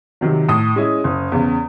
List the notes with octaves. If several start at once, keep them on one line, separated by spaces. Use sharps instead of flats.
C3 D#3 F#3
A2 D#6
G#3 C#4 E4
F#1
E2 C#3